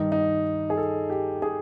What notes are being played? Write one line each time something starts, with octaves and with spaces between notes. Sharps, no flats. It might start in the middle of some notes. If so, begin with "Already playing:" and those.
Already playing: G2 D#3 D#4
D#4
G#4
A4
G4
G#4